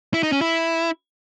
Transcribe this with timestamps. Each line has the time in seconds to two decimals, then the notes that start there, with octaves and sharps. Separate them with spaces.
0.14 E4
0.23 D#4
0.32 C#4
0.41 E4